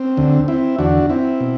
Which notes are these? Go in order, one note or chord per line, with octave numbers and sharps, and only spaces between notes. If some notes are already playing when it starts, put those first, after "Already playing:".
Already playing: C4
D2 D3
C4 E4
E2 D3 D4 F#4
C4 E4
B2